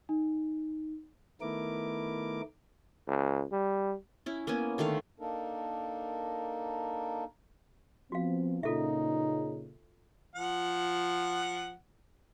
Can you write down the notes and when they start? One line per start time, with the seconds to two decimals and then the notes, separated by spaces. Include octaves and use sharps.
0.09 D#4
1.41 D#3 A3 B3 E4 A#4 D6
3.08 C#2
3.52 G3
4.26 C#4 E4
4.47 A#3 B3 C#4 G#5
4.78 D3 D#3 A3 F5
5.20 A#3 D4 D#4 A4 A#4
8.12 F3 B3 C4 F#4 F5
8.63 A#2 C#3 D#4 F4 A4 E5
10.36 F3 F#5